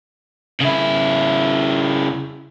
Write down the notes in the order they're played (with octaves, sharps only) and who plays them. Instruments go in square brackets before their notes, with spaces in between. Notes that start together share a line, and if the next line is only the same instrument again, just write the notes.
[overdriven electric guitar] C#3 E4